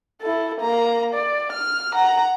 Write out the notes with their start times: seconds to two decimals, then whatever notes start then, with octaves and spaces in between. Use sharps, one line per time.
0.21 E4 A4
0.61 A#3 A#5
1.14 D5
1.53 F6
1.95 F#5 A#5